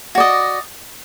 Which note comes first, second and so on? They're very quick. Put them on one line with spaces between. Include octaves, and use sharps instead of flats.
F#4 D5 D#5